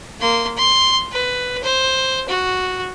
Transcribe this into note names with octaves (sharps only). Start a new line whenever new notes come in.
A#3 C6
C6
B4
C5
F#4